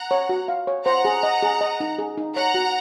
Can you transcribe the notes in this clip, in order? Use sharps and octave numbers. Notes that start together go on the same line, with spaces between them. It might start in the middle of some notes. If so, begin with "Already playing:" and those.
Already playing: F#5 A#5
C#5
F#4
F5
C#5
C5 F#5 A#5
G#4
D#5
G#4
D#5
D#4
G#4
D#4
C#5 F#5 A#5
F#4